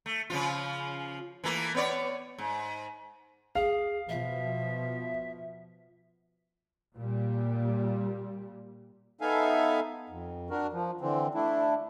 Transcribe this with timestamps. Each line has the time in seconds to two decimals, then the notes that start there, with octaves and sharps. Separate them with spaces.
0.06 A3
0.30 C#3 F3 F4
1.44 E3 A3 A#3
1.75 B3 C#5 D5
2.38 G#2
3.55 G#4 F5
4.09 B2 F3 E5
6.95 A#2 G3
9.21 B3 D#4 A4 E5 F5 G#5
10.10 F2
10.50 D4 F#4 A#4
10.73 F3
11.01 D3 E3 C4
11.34 A3 D4 E4